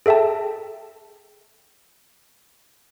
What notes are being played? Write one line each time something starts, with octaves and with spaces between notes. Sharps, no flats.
G#4 A4 E5 G5 A5